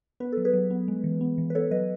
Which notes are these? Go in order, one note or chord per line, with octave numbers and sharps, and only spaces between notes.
B3 B4
F#3 A4
G#4 B4
F#3
B3
G#3
E3
B3
E3
B4
B3 A4 C#5
F#3 B4 D#5